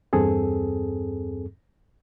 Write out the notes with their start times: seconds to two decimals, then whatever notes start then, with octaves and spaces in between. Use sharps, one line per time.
0.13 E2 G2 C4 G#4 A4